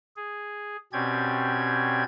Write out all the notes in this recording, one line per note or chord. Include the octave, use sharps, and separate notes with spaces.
G#4
B2 C4 C#4 G4 D5 G#6